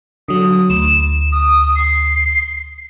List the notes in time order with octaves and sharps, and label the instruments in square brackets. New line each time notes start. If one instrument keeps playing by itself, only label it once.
[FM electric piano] D3 F#3 [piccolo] D#6
[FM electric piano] D2 [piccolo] E7
[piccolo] D#6
C7